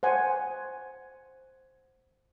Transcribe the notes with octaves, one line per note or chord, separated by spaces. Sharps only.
C5 F#5 G#5